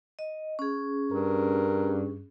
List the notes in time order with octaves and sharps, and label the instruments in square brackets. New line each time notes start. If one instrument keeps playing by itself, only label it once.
[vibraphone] D#5
C#4 G#4
[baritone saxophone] G2 [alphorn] A#4